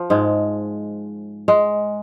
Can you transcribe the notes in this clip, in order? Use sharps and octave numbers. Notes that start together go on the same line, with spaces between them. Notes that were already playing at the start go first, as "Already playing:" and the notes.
Already playing: F3
G#2 G#3
G#3